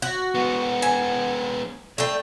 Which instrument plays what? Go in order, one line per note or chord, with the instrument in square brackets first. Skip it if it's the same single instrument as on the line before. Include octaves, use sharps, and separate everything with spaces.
[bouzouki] F#4
[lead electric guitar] G#3 B3 [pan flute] F#5
[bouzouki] G#5
[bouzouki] A3 G5 [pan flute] D5